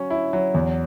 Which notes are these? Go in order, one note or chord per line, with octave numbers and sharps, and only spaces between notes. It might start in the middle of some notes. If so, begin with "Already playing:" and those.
Already playing: F#3 C#4
E4
F#3
E2